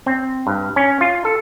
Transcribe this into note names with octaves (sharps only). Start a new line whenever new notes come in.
C4
G2
C#4
F4
A4